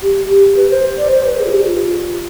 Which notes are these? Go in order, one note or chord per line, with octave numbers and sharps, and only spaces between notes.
G4
G4
B4
C5
D5
C5
B4
G#4
F4
G4
F4